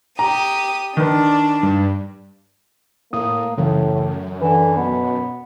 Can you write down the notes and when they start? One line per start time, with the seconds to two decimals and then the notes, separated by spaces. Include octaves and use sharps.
0.19 G4 A#5 D#6
0.97 D#3 D4 B4
1.63 G2
3.13 A2 A#3 D#6
3.58 F#2 A2 C#3 E3
4.42 D3 E3 B4
4.77 B2 B3